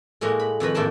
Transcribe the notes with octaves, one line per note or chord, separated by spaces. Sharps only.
A2 G#3 A#3 F#4
B5
F2 D#3 B4 B5
F2 A2 A#3 G5 A5 C6